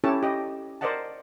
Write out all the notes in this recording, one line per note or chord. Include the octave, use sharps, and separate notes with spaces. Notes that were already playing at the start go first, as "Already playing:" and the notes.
C#4 E4 G4 A4 C#5 A5
G4 D#5
A#4 C5 D5 D#5 F#5 A5